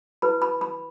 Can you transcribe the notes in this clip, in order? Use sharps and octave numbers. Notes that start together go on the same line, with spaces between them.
E4 B4 B5
B5
B5